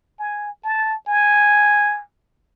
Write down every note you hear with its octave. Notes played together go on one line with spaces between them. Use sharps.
G#5
A5
G#5